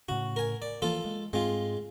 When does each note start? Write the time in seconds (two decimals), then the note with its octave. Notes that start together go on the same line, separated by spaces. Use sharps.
0.09 A2 C#3 F#4
0.36 A#4 G#5
0.62 D5
0.82 E3 F3 A#3 F4 A4
1.05 G#3
1.33 G#2 G#3 C4 F4